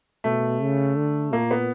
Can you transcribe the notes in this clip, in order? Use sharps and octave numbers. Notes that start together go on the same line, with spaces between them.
B2 A3
C#3
D3
A#2 A#3
B3